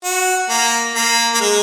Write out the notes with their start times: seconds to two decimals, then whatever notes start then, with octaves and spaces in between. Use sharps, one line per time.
0.04 F#4
0.50 A#3
0.95 A#3
1.34 A#3
1.41 G#3